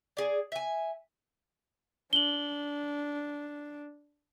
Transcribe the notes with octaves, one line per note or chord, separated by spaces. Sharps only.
G#4 D5
E5 G#5
D4 F#7 G7